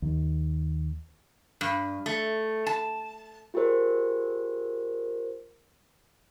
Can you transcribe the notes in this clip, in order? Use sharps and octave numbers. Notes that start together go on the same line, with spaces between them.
D#2
G2
A3
A5
F4 G4 G#4 A#4 C5